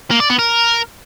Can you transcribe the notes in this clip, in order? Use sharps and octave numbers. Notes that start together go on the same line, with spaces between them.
A#3
D5
B3
A#4